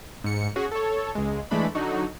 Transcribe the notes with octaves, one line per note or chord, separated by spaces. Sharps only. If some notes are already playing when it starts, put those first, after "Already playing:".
G#2 C#7
C#4 F#4 G#4
A4 C#5
C#2 G#3
E3 G#3 A3 D4 B5
D3 F#3 D#4 F#4